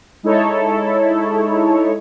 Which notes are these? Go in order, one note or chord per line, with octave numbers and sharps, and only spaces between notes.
G#3 D#4 E4 A4 C#5